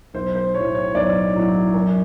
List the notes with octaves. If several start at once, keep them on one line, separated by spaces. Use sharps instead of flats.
B1 C5
C5
A2 F#3 C#5
C#5
B1 D5
A2 F#3
F#2